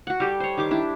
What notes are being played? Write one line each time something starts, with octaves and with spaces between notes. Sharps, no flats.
F#4 F#5
G3 G4 A4
C5 C#5
D#3 G4 D6
D4 E4